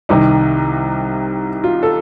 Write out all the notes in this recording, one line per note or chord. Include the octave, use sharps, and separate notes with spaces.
C2 C3 D#3 D#4
F4
A4